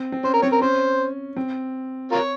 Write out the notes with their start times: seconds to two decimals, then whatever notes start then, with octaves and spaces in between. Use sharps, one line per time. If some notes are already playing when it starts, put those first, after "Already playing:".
Already playing: C4
0.12 C4
0.23 C#4 C5
0.34 A#4
0.42 C4 C#5
0.52 A#4
0.61 C#4 C5
1.36 C4
2.12 F4 A#4 C#5